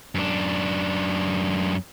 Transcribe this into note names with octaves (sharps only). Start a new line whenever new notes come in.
F#2 D4